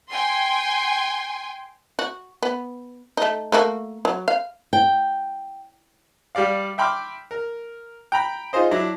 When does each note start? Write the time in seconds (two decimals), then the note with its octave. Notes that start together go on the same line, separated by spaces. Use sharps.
0.10 G5 G#5 C6
1.99 F#4
2.43 B3
3.17 A3 D#4
3.52 A3 A#3 F#4
4.05 F#3
4.28 F5
4.73 G5
6.35 G3 G4 D5 F5
6.78 E5 G5 B5 C6 D6 F6
7.31 A#4
8.12 G5 A#5 B5
8.53 D#4 F4 G#4 C5 D#5
8.71 F#3 D4 E4